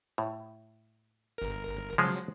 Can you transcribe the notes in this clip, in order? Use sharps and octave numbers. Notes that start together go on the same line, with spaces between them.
A2
G1 A#4
C#3 F3 F#3 G#3 G#4